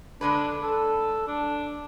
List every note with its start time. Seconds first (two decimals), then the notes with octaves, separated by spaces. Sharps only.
0.21 D3 G#3 D4 B4
0.62 A4
1.28 D4